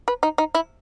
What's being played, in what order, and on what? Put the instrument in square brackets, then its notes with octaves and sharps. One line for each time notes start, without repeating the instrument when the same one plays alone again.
[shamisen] B4
D#4
D#4
E4